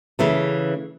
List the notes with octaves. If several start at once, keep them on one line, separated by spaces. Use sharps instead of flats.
C#3 E3 A3